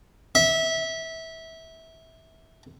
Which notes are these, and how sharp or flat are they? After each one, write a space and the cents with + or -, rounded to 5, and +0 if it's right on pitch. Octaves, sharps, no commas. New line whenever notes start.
E5 -20